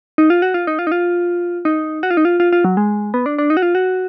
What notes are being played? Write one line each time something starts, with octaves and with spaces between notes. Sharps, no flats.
D#4
F4
F#4
F4
D#4
F4
D#4
F4
D#4
F#4
F4
D#4
F4
F4
F4
F#3
G#3
B3
D4
D4
D#4
F#4
F4
F#4